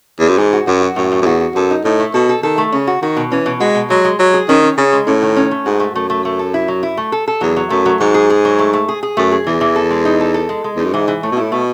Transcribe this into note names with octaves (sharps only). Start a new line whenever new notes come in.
E2
F#2
G#2 E3
F#4
F#2 F#4
F#4
F#2 A2
A2
F#2
E2 F#4
F#4
F#2 A4
D#4
A2 D#4
A3
B2 A4
A4
D#3 A4
A3
C#3 C#4
F#4
D#3 F#4
B2
E3 C#4
B2
G#3 F#4
B2
F#3 G#3
G#3
F#3 G#3
G#4
D#3 C#4
C#4
C#3 C#4
G#3
A2 C#4
D#3
C#4
A3
G#2 F#4
A3
F#2 A3
A3
A3
A4
E4
F#3
E4
A3
A4
A4
E2 F#3
F#3
F#2 A3
F#3
G#2 F#3
G#4
G#4
F#3
A3
A3
G#4
G#4
F#2 A3
G#4
E2 E3
E3
A4
G#3
D#4
A4
A4
G#3
G#3
E2 D#4
F#2
G#2 E3
E3
A2 A3
B2
A2 E4
B2 A3